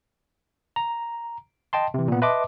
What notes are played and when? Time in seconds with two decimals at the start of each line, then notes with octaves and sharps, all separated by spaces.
0.76 A#5
1.73 D#5 G5 A5 C6
1.94 C3 E3
2.08 A#2 B3
2.22 B4 D#5 E5 A5 C6 D6